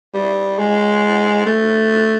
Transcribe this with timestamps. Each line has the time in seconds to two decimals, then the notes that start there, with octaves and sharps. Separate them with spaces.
0.14 G3
0.58 G#3
1.46 A3